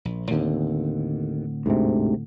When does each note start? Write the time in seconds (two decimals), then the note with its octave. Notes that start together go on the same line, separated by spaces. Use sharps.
0.05 A#1
0.31 D#2 A2 D3 C4
1.66 D2 G#2 C3